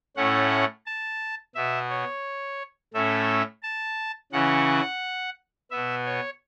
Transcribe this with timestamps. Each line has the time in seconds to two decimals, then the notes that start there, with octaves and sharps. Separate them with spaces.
0.16 A2 A3 C#4 F#5
0.86 A5
1.55 B2 B3 E5
1.90 C#5
2.94 A2 A3 C#4 E5
3.63 A5
4.32 C#3 E3 C#4 F#5
5.71 B2 B3 E5
6.05 C#5